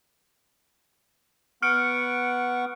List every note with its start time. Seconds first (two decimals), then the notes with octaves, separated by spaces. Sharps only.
1.62 B3 F#5 C#6 F6 C#7 D7